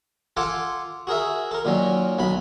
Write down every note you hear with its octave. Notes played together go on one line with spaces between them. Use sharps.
F4 A4 F#5 G#5 A5 D6
F#4 G#4 A#4 E5
A4 A#4
A#2 D#3 F#3 C#4
B1 F#3 B5